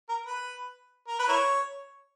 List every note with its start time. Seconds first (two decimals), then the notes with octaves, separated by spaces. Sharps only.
0.09 A#4
0.26 B4
1.08 A#4
1.19 B4
1.28 E4 A#4 C#5